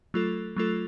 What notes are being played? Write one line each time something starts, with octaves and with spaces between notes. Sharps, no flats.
F#3 A3 F4 A4
F#3 A3 F4 A4